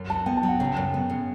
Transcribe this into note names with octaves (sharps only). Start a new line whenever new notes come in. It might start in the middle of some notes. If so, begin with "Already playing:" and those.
Already playing: F#2
F#3 A5
B3 G5
A5
F#3
F#5
C#3 G5
F#2
B3
C#3